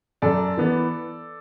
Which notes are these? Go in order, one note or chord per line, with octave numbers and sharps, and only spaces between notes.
F#2 A4 D5
E3 B3